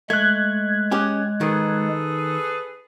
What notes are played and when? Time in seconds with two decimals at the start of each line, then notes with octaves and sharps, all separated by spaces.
0.10 G#3 A3 F#6 G#6
0.91 C#4 G4 G#4
1.41 D#3 G#4 A4 B4